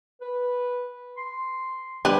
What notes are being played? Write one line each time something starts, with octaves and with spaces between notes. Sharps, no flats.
B4
C6
F3 G3 D4 G4 B4 G#5